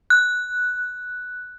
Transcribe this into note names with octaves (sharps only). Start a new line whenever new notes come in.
F#6